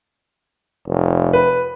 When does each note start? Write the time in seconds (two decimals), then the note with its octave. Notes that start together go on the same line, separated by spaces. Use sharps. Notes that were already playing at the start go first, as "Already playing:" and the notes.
0.87 F1
1.33 B4